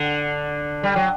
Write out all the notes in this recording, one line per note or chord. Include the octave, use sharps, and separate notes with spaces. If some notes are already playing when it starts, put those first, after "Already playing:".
Already playing: D3
G3
F#3